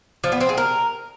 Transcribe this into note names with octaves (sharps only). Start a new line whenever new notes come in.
F3
B3
C4
G#4
A#4